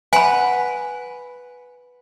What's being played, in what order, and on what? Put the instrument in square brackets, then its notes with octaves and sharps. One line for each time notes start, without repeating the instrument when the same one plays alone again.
[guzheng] B4 F#5 [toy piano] G#5 B5